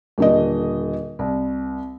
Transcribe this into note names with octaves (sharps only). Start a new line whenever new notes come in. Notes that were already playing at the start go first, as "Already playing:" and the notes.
D#1 D3 D#5
C2